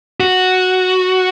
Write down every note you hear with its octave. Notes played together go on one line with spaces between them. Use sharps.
F#4